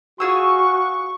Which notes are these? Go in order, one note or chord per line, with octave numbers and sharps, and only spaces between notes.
F4 F#4 G#4 C#6 E6